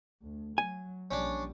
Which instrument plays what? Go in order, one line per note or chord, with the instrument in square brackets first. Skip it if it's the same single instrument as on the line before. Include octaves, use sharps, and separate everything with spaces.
[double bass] D2
[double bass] F#3 [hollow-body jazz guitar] G#5
[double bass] A#1 G3 [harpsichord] C#4 D4